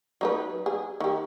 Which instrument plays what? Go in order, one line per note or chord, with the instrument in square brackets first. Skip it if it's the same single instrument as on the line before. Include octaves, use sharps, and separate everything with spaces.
[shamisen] F#3 D#4 B4
G#4
D#3 G4